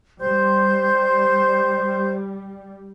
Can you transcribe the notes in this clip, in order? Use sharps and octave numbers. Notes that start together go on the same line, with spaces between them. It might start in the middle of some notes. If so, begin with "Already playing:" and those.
G3 C5 C6 G6